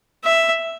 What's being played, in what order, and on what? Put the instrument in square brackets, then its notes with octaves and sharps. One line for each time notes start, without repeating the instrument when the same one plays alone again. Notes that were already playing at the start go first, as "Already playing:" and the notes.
[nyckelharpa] E5